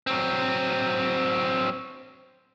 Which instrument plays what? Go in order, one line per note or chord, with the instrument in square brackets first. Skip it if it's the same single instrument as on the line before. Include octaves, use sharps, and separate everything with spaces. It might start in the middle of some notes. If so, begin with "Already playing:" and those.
[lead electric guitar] F#3 C4